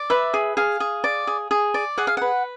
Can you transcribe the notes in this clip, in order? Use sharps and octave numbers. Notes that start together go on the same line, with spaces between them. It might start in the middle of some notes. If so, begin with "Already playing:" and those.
Already playing: D5
B4 E5
G#4
G#4 F5
G#4
D5
G#4
G#4
D5
G#4 F#5
F5
B4 F#5